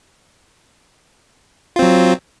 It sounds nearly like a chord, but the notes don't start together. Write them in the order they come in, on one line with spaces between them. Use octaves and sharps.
F4 C4 F#3